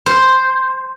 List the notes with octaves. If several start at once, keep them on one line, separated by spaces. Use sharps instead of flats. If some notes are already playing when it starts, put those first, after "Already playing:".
C5